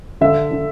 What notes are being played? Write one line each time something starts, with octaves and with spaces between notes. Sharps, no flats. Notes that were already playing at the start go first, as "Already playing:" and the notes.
D3 E5
D3